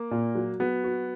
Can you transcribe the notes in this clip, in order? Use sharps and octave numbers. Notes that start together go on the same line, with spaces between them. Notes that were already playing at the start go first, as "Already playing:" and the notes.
Already playing: A#3
A#2
F#3
F#3 B3
F#4